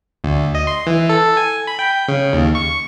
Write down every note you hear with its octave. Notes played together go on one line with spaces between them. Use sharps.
D2
D#5
C6
E3
A4
G#5
B5
G5
C#3
D#2
C#6